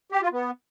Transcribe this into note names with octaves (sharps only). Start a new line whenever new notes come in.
G4
F4
B3